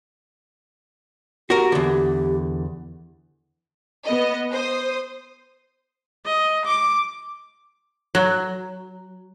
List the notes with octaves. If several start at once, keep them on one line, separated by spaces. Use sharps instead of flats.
F#4 G4 A#4
E2 D3
B3 D#5
C5 D#6
D#5
D6
F#3